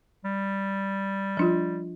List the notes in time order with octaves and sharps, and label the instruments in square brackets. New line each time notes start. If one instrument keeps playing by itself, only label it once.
[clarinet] G3
[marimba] F3 D4 F4